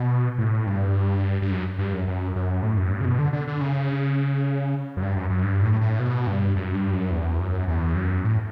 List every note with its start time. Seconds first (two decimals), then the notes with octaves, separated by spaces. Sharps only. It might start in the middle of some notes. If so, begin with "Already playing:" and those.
Already playing: B2
0.38 A2
0.67 G2
1.42 G2
1.51 F#2
1.79 G2
1.93 F#2
2.08 F#2
2.36 F#2
2.63 A2
2.77 F#2
2.91 G2
3.01 C#3
3.05 B2
3.19 D3
3.33 D3
3.47 D3
3.61 C#3
4.97 F#2
5.02 G2
5.16 F#2
5.30 F#2
5.44 G2
5.62 A2
5.81 A2
5.99 B2
6.27 G2
6.56 F#2
6.74 G2
6.92 F#2
7.11 E2
7.39 F#2
7.68 E2
7.96 F#2
8.24 A2